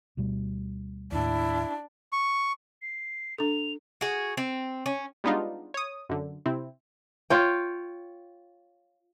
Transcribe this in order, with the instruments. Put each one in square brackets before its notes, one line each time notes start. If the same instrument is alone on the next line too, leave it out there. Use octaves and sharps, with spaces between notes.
[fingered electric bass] D2 B2 G3
[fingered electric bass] D#2 A2 [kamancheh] D4 [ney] E4
[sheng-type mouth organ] C#6
[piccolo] C7
[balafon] D4 A4 [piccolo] F7
[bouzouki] F#4 G#4
C4
C#4
[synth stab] G3 G#3 B3 D4 D#4 F4
C#5 D#6
F#2 D3
C3 C4 E4
[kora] F4 C#5 G5